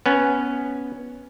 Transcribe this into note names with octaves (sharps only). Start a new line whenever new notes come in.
B3 C#4